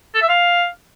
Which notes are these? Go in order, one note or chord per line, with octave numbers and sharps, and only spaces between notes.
A4
E5
F5